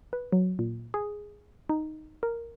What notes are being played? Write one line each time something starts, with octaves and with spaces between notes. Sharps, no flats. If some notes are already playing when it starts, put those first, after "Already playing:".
B4
F#3
A#2
G#4
D#4
A#4